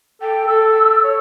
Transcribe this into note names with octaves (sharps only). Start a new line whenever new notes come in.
A4 G5
A4 E6
C#5